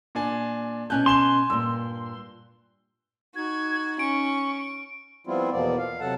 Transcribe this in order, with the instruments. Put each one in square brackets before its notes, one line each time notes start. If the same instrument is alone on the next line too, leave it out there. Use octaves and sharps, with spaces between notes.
[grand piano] A#2 D4 G#5
[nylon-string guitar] B2 C#4 A5 [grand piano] G#5 F#6 G6
[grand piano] G#5 E7 G7 [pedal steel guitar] C6
[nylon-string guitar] G2 A#2 [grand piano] E6
[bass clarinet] D#4 [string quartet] F#4 [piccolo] G#6
[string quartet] C#4 [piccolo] C#6 [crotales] D7
[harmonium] F3 G3 B3 C4 E4 F4
E2 B2 F3 A#3 B3 D5
F5
C3 F#3 A4 F#5 A5